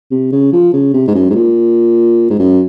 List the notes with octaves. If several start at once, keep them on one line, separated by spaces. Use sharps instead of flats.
C3
C#3
F3
C#3
C3
G#2
F#2
G#2
A#2
G#2
F#2